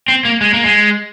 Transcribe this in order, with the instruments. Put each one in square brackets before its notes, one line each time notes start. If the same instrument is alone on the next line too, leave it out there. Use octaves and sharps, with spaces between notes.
[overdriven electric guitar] C4
A#3
G#3
A#3
G#3